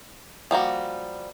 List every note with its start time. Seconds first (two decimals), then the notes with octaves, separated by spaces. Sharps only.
0.51 F3 G3 A#3 F#4